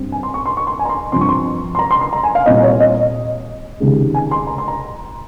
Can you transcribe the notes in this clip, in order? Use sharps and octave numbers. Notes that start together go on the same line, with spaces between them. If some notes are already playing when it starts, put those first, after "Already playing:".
Already playing: G2 C4
G#5
C6
C#6
C6
C#6
C6
G#5
A#5
C6
G2 F3 C4 C6
C#6
C6
C6
A#5
C6
C6
A#5
G#5
F5
A#2 G3 C4 D#5
C#5
D#5
C#2 C3 D#3 G#3
G#5
C6
A#5
C6
A#5